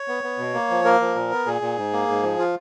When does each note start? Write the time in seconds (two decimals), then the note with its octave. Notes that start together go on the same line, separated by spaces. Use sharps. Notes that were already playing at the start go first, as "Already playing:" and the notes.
Already playing: C#5
0.08 B3
0.24 B3
0.38 B2
0.54 A#3
0.70 F3
0.84 A#3 A#4
1.00 F3
1.15 A#2
1.32 B3
1.46 A#2 G#4
1.61 A#2
1.77 G#2
1.92 A#3
2.08 G#2
2.23 F3
2.39 F4